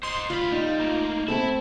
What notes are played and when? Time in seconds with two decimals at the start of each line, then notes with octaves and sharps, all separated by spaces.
0.03 C5 D#5 C6
0.30 D2 F4 B5
0.52 G3 D#4
0.79 A3 A#3
1.28 A3 C4 E4 A4 E5